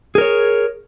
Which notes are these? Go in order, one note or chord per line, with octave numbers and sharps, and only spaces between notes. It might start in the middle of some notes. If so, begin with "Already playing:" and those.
G#4 A#4 C#5